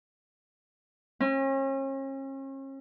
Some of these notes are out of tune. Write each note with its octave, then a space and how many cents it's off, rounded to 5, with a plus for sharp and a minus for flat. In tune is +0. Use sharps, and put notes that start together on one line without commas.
C#4 -40